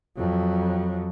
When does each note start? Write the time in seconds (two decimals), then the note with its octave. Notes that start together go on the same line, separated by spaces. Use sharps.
0.17 F2 F#3